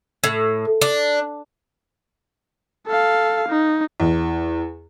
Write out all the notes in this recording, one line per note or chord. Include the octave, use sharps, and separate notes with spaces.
A2
D4
A4 F5
D#4
E2